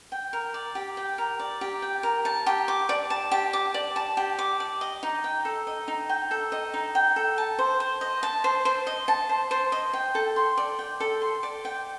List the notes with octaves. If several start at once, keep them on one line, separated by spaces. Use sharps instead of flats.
G5
A#4
D5
G4
G5
A#4
D5
G4
G5
A#4
A5
G4
D6
D5
A5
G4
D6
D5
A5
G4
D6
D5
D#5
D#4
G5
A4
D#5
D#4
G5
A4
D#5
D#4
G5
A4
A5
C5
C5
D#5
A5
C5
C5
D#5
A5
C5
C5
D#5
G5
A4
C6
D5
G5
A4
C6
D5
G5